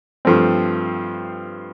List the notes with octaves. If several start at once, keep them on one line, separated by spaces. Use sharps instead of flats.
G2 F3 A3 C4